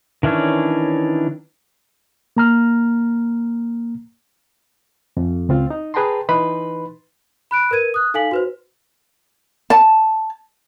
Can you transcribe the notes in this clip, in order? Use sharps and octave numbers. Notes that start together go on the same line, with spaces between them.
D#3 E3 C#4 D4 C#5
A#3 A#5 F6
F2
C#2 C4 F4
D#4
G#4 B4 G5 A5 A#5 C6
E3 D#4 B4 B5 C6
B5 F#6 D7
A#4 B4 G#6 D#7
D#6 F#6
D#4 A4 F5 G#5 B6 F#7
F#4 B4 C5
A5